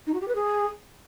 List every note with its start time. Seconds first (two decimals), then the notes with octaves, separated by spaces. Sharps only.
0.06 D#4
0.13 F#4
0.21 G4
0.28 B4
0.35 G#4